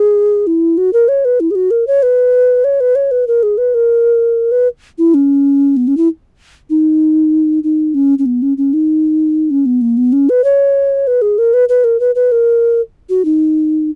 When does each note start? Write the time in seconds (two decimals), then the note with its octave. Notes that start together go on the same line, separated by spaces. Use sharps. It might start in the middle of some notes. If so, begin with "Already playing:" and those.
Already playing: G#4
0.47 E4
0.78 F#4
0.93 A#4
1.08 C#5
1.25 B4
1.40 E4
1.51 G#4
1.55 F#4
1.71 A#4
1.87 C#5
2.03 B4
2.64 C#5
2.80 B4
2.95 C#5
3.11 B4
3.27 A#4
3.43 G#4
3.58 B4
3.74 A#4
4.52 B4
4.98 E4
5.14 C#4
5.77 B3
5.88 C#4
5.97 E4
6.70 D#4
7.64 D#4
7.94 C#4
8.19 C#4
8.26 B3
8.42 C#4
8.58 C#4
8.73 D#4
9.51 C#4
9.66 B3
9.81 A#3
9.97 B3
10.13 C#4
10.29 B4
10.44 C#5
11.07 B4
11.22 G#4
11.38 A#4
11.54 B4
11.69 B4
11.84 A#4
12.00 B4
12.15 B4
12.32 A#4
13.09 F#4
13.25 D#4